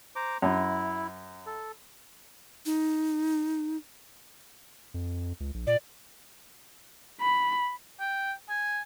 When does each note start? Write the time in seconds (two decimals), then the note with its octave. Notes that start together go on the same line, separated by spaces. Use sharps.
0.16 C5 A#5 D6
0.42 F#2 E4
1.47 A4
2.66 D#4
4.94 F2
5.40 C#2
5.54 A#1
5.67 A#2 D5
7.21 B5
8.00 G5
8.49 G#5